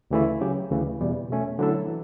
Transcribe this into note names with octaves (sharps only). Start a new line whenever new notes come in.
D2 C#3 E3 A3 E4
C#3 F#3 C#4 G4
D2 C#3 E3
E2 B2 G3
B2 A3 C#4
D3 F#3 A3 E4 A4
E3